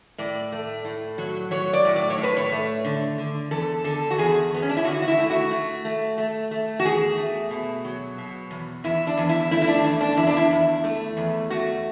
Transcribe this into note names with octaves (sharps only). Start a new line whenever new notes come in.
A2 D5
A3
A2
F#3
F#3 C#5
D5
A2
D5
C#5
A2
B4
C#5
A3
D3
D3
E2 A4
D3 A4
F#4
E2 G#4
E2 B3
C#4
D4
E4
D3 F#4
F#4
E4
A3
F#4
A3
A3
A3
A3
F#4
E2 G#4
A3
B2
F#3
B2
E2
E2 E4
D4
E2
E4
A3 E4
E4
D4
E2
D4
E2 E4
D4
E4
E2
A3
E2
A3 F#4